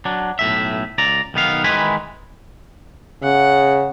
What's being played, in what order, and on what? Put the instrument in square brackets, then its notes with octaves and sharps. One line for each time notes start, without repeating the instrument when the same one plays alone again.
[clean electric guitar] F#3 D4
B1 A2 E5
C#2 D5 A#5
B1 D#3 B3 F5
D#3 E3 G#3 B4 G#5 B5
[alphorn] C#3 [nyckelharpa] F#5